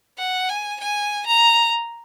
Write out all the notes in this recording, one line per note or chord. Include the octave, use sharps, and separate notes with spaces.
F#5
G#5
G#5
A#5